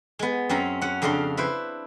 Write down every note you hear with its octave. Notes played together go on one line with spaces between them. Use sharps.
G#3 B3
F#2 C4 C#4 A#5
C#4 F#5
F2 C#3 D4 F5 A#5 C6
E4 B4 C5